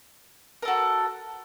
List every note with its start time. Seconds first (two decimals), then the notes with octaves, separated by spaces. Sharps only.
0.62 A#4
0.65 A4
0.68 F#4